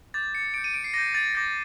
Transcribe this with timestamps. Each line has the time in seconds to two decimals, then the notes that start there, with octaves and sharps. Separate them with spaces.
0.14 D6 G6 A6
0.35 C#7
0.54 D6 G6 D7
0.64 D#7
0.74 D7
0.84 C7
0.94 D6 G6 A#6
1.14 A6
1.35 D6 G6 A#6